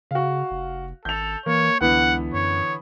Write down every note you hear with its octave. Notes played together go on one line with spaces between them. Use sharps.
C#3 F#4 F5
F1
G#1 A4 G6 F7
E3 A#3 C#5
C#2 D3 E3 B3 F#5
F#2 C#5